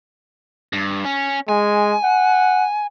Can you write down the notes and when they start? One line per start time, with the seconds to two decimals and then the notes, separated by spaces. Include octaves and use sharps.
0.73 G2
1.05 C#4
1.49 G#3 G#5
2.04 F#5